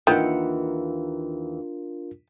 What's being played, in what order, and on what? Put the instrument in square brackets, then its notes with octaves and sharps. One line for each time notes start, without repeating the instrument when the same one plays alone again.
[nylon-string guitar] D#2 E3 F#5 [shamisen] D#3 [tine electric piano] D4 F4 A#4